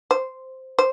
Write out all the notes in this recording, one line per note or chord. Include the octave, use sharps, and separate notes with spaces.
C5
C5